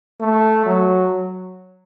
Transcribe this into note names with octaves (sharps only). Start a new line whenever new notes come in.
A3
F#3